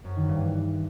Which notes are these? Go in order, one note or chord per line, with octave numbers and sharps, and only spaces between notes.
F#2
D#3
G2
E3